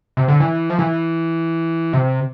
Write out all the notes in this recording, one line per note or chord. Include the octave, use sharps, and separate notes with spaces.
C3
D3
E3
F3
E3
C3